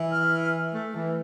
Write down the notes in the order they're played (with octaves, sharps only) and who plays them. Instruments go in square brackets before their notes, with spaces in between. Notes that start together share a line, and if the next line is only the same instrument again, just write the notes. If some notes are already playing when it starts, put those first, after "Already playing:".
Already playing: [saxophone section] E3
[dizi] F6
[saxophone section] A3
E3